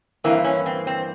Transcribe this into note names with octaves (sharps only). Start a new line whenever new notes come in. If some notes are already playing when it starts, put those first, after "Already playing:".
G2 E3 A#3 C4
C#4
C4
C4